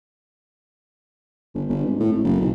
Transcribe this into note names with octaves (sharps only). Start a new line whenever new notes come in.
G1
G1
G#1
A2
G#1
F#1
B1